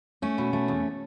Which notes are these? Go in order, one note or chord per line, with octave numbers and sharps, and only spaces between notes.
A3 C#4
B2
A3
E2